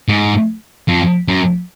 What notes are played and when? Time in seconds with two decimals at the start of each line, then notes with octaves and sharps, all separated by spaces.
0.08 G#2
0.88 F2
1.28 F#2